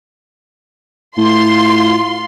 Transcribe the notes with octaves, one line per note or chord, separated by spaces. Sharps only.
A2 F4 C6